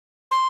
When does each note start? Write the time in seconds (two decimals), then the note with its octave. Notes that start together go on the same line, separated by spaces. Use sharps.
0.31 C6